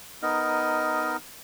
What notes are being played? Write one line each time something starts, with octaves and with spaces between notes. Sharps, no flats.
B3 D#4 A#4 D#5